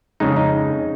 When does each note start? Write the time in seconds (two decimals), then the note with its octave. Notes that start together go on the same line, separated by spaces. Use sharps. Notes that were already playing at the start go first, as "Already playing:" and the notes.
0.20 F2 C#3 G#3 D#4
0.36 D#4